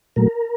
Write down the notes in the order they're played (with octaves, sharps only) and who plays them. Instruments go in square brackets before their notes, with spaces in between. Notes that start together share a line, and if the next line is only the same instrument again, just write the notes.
[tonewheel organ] A#2 F#3 A3 A#4